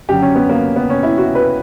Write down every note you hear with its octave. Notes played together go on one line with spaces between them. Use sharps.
F#2 D3 F#3 G4
C#4
B3
A#3
B3
C#4
E4
F#4
B4